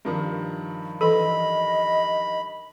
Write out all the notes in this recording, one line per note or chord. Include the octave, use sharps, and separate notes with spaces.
G2 D#3 F3
E3 A4 D#5 B5